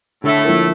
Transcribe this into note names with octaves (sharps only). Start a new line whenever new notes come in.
A2 D3 A3
F3 A#3 E4 A#4